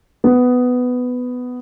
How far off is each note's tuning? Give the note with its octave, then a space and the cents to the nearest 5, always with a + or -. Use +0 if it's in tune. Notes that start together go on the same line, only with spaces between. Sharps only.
B3 +10